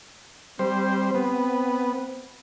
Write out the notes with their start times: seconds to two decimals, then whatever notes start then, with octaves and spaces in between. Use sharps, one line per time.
0.59 G3 C4 C5
1.15 B3